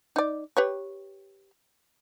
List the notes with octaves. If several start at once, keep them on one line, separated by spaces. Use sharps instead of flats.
D#4 D5
G4 B4 C#5